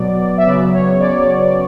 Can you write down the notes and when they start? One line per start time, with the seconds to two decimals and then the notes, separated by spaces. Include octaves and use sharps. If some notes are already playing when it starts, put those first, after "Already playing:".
Already playing: B2 F#3 B3 D5
0.38 E5
0.46 C#3 F#3 B3 D5
0.74 C#5
1.00 D5